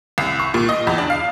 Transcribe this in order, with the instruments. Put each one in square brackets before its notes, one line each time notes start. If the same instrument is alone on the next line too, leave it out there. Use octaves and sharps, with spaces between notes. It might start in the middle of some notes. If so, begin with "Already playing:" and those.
[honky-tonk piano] C2
C#6
A#2
D#5
E2
D4
F5